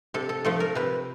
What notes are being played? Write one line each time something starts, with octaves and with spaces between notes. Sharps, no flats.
C3 A4
A4
F3 A3 A4
A#4
C3 B4